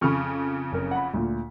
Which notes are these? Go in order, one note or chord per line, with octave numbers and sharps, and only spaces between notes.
F2 C#3 B5 C#6 F6
F#1 A#4
F#5 B5
D2 A#2